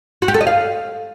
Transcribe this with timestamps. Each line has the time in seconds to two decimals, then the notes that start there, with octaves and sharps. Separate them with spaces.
0.22 F#4
0.28 G4
0.34 A4
0.41 D#5
0.47 F5